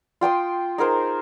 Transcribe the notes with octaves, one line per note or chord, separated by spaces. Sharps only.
F4 G5 C6 D#6
D#4 G#4 A#4 C5